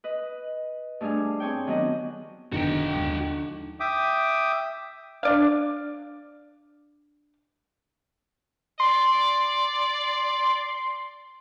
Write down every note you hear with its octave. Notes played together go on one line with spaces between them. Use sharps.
B4 D#5
G2 A3 D4 G#4 F5
C4 G#4 C#5 G5
D#3 F#3 B3 D4 D#5
F#1 D3 D#3 B3 D#4 F#4 G5
D#2 F3 G#3
E5 G5 D6 D#6
D4 D5 F5
D5 C6